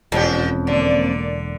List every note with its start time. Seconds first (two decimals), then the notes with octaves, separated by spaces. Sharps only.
0.12 E1 F2 A#2 C#4 G4
0.67 D3 A#3 D5